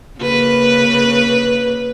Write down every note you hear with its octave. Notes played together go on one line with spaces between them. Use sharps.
C#3 A#3 B4